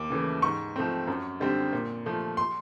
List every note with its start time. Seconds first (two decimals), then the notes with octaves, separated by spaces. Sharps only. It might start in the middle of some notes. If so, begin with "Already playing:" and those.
Already playing: D#2 D6
0.10 C#3 E3 A3
0.42 G#2 C#6
0.76 F3 A3 C4
1.07 F#2
1.40 D3 G3 C4
1.73 A#2
2.06 F3 A3
2.37 C6